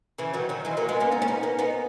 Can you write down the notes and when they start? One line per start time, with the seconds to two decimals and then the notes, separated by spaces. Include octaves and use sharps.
0.18 C#3 E3
0.34 D#3 F#3
0.49 D#3 F#3
0.65 E3 G#3
0.77 F#3 A#3
0.89 G#3 B3
1.00 A#3 C#4
1.12 B3 D#4
1.22 C#4
1.28 B3 D#4
1.43 A#3 C#4
1.59 B3 D#4